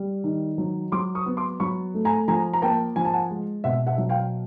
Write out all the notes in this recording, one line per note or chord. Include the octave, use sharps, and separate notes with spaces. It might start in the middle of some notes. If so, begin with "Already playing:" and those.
Already playing: G3
D#3
F#3
F#3 C6 D6
C#6 D#6
B3
C6 D6
F#3 B5 C#6
A3
G#5 A#5
F3 G#5 A#5
A#5
A#3 G5 A5
F3 G#5
A5
F#5 G#5
G#3
B2 E5 F#5
E5 F#5
F#3
F5 G5